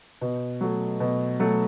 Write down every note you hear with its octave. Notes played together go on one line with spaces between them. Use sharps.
B2
F#3 A3
B2
F#3 A3